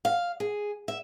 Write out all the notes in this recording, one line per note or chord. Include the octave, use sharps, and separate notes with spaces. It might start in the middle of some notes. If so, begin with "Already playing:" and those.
F5
G#4
E5